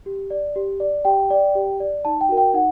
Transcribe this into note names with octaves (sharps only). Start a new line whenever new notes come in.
G4
D5
G4
D5
G4 G5
D5
G4
D5
D#4 A5
G5
F#4 A#4
G5
D#4 F#5